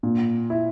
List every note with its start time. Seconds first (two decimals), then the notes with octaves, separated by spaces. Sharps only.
0.03 A#2
0.50 E4